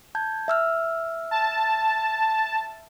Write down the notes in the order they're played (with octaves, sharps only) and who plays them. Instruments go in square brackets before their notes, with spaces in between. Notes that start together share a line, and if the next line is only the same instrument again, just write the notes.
[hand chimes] A5 G6 G#6
E5 E6 F6
[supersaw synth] A5